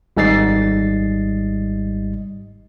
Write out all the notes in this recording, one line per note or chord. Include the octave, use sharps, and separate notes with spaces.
G#1 G#2 G3 D#5 A6 C7